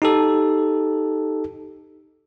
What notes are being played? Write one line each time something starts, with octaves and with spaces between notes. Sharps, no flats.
D#4 G4 A4